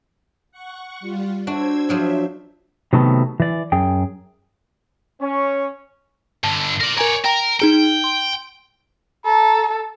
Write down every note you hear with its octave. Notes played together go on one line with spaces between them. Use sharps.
F#5 C#6
G3 F4
D4 F#4 C5 E6 G#6
F3 F#3 D4 C5 E5
C3 D#3 F#3 A3 B3
E3 D5
F#2 G#4 G5
C#4
G2 D3 A5
A#4 D5
A#4 C#5 D5 G#5 A#5
A#4 G5 A#5
D#4 G#4 G5 A#5
C6
A4 A#5